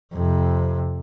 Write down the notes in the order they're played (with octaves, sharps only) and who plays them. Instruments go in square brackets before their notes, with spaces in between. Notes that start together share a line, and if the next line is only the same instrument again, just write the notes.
[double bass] F2 C3